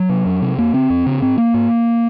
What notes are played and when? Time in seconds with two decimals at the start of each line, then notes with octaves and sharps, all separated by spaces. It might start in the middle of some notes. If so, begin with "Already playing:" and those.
Already playing: F#3
0.09 C3
0.26 F2
0.42 C3
0.58 F2 A#3
0.74 C#3 C4
0.90 F2
1.06 C#3
1.22 G#2 C4
1.38 A#3
1.54 G#2